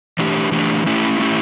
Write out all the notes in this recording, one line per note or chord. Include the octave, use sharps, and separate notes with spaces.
E3 A3 D4 G4
E3 A3 D4 G4
A3 C#4 E4 G4
A3 C#4 E4 G4